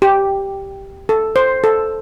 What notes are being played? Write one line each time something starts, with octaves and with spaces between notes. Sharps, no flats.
G4
A4
C5
A4